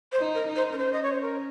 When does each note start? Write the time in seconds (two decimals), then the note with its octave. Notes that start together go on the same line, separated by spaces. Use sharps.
0.12 C5
0.19 D#4
0.35 A#4
0.48 D#4
0.56 C5
0.72 A#4
0.78 C#4 C5
0.93 D#5
1.03 C#5
1.12 C5
1.22 A#4